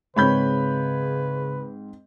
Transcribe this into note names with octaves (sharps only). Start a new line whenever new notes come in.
G#2 C#3 C4 B4 C#5 B5 G6